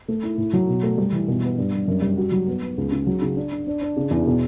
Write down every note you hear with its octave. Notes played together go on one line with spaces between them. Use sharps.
A3
E4
A2
F#3
B2
A3
G3
E3
B2
B3
G2
G2
F#2
G3
F#4
F#3
B3
B3
C#2
C#3
F#3
C#3
D4
D4
D4
D4
C#3
E2
B2